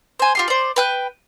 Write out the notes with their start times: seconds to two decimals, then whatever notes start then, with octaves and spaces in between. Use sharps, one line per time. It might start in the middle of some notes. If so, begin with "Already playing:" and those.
0.19 C5 G#5
0.35 F4 G4 C6
0.48 C5 D5
0.76 B4 G5 F#6